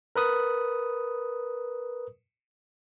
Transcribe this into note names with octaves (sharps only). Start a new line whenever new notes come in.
A#4 B4 D#6